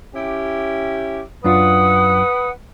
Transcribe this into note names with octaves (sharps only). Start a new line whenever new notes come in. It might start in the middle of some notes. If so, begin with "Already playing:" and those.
C#4 E4 G4
F#2 D4 F4 B4 F#5 D#6